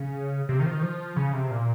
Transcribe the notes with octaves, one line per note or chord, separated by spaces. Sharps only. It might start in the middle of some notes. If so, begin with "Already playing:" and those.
Already playing: C#3
C3
D#3
F3
D#3
F3
C#3
C3
A#2